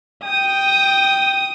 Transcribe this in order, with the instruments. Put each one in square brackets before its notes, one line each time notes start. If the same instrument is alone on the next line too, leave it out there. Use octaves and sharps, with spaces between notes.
[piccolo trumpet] G5 [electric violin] D#6